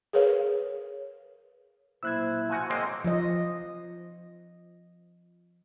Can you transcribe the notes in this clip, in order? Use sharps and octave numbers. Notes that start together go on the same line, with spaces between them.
G#4 A#4 B4 C#5 F5
B1 A#2 E4 C5 E6 F#6 G#6
F3 F#4 G#5
G#3 A#3 C4 C#5 D#5
F3 F4 D#5